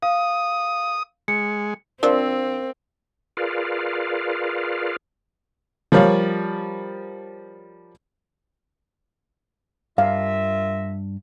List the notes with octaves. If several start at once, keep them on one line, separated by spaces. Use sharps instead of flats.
F5 D#6
G#3 C#7
F3 C4 D4 A#4 C5 F5
F4 G#4 A#4 B4 D5 F5
F3 G3 A#4 C#5 F5
G2 F4 A#4 E5 F5